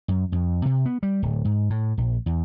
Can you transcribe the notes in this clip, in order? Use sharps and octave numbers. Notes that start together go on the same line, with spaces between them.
F#2
F2
C3
B3
G3
D1
G#2
A2
A#1
E2